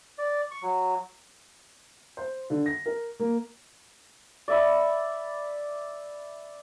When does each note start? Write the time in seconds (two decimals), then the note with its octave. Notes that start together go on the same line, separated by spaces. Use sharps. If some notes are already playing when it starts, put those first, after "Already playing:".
0.18 D5
0.51 C#6
0.62 F#3
2.17 C5
2.50 D3
2.66 A#6
2.86 A#4
3.19 A#3
4.48 D5 E5 B5